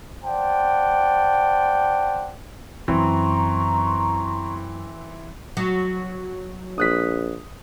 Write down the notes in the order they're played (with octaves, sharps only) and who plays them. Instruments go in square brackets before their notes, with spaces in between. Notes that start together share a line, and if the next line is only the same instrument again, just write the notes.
[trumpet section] C5 D5 F#5 G5 A5
[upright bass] F#2 [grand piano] E3 C4 [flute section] A#5 C6 C#6
[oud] F#3
[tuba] A#1 [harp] D#6 F#6 B6